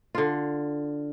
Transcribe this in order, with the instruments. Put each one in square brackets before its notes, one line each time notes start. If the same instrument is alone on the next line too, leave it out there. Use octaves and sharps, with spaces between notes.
[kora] D3 F4